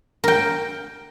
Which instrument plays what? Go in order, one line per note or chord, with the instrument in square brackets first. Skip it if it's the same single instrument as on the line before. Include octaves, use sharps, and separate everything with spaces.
[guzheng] A#4 G5